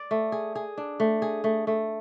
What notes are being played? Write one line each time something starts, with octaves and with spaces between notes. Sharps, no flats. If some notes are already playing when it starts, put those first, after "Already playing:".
Already playing: D5
A3
G#4
G#4
D4
A3
G#4
A3
A3